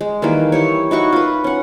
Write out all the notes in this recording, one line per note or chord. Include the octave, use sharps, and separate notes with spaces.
G#3
D#3 E3 G3 A#3
E4 G4 C#5
D#4 E4 F#4 C#6
F4 B4
C#4 F#5